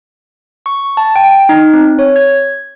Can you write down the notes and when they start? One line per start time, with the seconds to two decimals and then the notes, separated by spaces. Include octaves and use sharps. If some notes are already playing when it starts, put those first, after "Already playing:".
0.66 C#6
0.97 A5
1.16 G5
1.49 D#4
1.74 C4
1.99 C#5
2.16 G#6